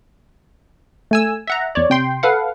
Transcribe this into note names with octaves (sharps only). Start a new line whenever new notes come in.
A3 G#5 E6
E5 F#5 A#5
E2 C#5 D5
C3 G5 C6
A4 B4 F5 F#5